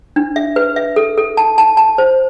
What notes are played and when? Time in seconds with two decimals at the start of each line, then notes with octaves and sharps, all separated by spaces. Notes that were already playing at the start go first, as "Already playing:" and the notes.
0.16 D4
0.36 E5
0.56 B4
0.76 E5
0.96 A4
1.18 A4
1.37 A5
1.58 A5
1.77 A5
1.98 C5